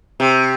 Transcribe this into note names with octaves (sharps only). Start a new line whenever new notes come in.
C3